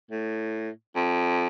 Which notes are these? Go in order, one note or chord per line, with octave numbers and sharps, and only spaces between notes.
A2
F2